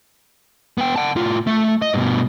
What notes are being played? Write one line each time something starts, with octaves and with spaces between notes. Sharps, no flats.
B3 G5
F#5 A5
A2 F4
A3
D#5
G2 B2